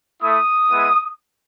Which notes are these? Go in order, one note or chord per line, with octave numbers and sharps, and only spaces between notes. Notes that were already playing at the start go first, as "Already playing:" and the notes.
A3 E4 D#6
G#3 B3 E4